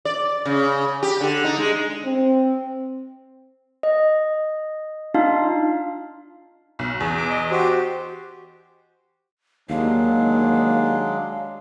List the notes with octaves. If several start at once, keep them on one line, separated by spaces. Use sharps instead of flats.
D5
C#3
G4
D3
D#4
G#3
C4
D#5
D4 D#4 F4 F5
B1
E2
D6
D#5
F#4 G4 C5
D#2 F#3 G#3 D4 F5